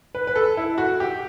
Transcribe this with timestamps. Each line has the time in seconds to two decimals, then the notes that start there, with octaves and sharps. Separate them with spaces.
0.15 B4
0.27 B4
0.36 A4
0.57 E4
0.78 F#4
1.00 G4